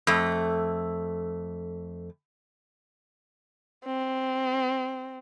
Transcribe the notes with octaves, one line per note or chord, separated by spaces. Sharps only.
F2 A3
C4